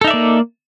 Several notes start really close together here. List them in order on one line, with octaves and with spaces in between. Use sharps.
A4 D#4 E5 D5 A#3